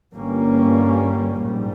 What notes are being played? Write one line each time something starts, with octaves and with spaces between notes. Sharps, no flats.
G1 G2 G3 A#3 C#4
A#1 G#2 G3